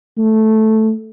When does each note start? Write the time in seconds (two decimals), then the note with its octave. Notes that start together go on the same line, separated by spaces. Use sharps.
0.18 A3